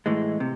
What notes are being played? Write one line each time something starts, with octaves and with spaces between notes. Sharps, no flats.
A2 E3 G#3
C3